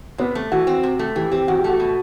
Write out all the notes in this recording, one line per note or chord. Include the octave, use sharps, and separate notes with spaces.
C3 B3
A3
E3 F#4
C4
C3
A3
E3 G4
C4 G4
E2 F#4
G4
A3 F#4
B2